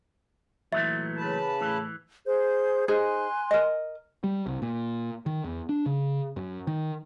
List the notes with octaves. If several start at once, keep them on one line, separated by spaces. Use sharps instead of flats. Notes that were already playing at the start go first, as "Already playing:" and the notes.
A#2 E3 F#3 A3 E5
C#3 B4 A5
A2 E3
G#4 C5 G6
D#4 G#4 C5 G#5 C6 F#6
A#4 D#5
G3
C2
A#2
D#3
E2
D4
C#3
F#2
D#3